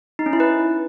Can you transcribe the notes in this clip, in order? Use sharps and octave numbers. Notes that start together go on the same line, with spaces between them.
D#4
C#4
E4
B4